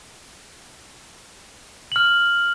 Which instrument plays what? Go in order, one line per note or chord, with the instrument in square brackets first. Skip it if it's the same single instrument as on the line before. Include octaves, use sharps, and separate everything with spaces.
[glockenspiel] F6 F#7